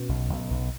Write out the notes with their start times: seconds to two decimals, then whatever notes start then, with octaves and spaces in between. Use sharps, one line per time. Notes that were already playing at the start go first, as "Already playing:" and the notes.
Already playing: B2 C#4
0.09 B1
0.29 B1
0.50 B1